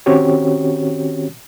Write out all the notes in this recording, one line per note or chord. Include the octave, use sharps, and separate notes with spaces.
D#3 C4 C#4 F#4 G4 C#5